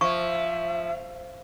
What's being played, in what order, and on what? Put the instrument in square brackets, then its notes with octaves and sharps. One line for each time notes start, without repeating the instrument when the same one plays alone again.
[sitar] F3 [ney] E5 [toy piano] C#6